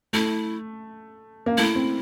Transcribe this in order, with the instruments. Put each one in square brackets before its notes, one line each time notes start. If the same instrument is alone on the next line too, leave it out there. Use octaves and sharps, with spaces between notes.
[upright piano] A3 [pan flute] E4
[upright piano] A#3
[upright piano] A3 [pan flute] E4
[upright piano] C4